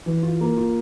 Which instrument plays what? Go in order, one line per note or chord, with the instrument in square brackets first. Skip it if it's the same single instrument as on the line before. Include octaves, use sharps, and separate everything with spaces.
[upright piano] E3
F4
A#3
F4